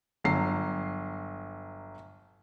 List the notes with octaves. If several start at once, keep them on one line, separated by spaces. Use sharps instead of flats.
G1 F#3 C7